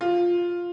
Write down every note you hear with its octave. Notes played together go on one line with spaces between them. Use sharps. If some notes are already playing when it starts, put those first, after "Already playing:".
F4